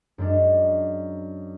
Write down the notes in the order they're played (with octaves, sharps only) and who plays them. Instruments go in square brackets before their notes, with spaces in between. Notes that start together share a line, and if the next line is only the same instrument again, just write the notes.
[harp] F#2 G#3 D4